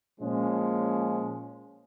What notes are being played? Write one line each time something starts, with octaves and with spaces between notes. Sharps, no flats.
A#2 F3 G#3 C#4